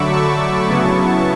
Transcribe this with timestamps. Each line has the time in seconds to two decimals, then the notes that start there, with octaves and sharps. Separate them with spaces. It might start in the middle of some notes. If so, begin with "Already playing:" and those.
Already playing: D3 F#3 A3 B5 C#6 D6 E6
0.12 A5 C#6
0.69 C#3 F#3 B3 E4